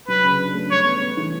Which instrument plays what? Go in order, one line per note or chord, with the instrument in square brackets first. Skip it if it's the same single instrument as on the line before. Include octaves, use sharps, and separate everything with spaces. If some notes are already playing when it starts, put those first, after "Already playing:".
[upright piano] F#3 [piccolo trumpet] B4
[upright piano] C#3
D4
A3
[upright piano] G3 [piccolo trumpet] C#5
[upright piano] B3
B3
E3